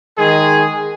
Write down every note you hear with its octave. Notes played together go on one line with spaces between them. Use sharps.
D#3 G#3 G#4